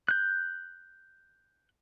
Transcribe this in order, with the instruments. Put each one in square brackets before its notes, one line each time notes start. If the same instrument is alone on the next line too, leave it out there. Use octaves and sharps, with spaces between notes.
[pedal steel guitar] F#6 G6